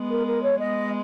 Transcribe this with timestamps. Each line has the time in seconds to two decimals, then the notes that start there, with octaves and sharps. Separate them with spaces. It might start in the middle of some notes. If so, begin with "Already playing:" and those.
Already playing: G#3 B3
0.09 A#4
0.26 A#4
0.42 C#5
0.59 G#3 B3 D#5